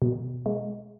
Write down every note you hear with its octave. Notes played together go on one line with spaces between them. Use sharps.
B2
G#3